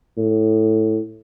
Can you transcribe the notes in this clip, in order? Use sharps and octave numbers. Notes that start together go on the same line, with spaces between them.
A2